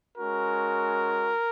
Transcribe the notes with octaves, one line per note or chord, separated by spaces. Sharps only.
G#3 C#4 F#4 A#4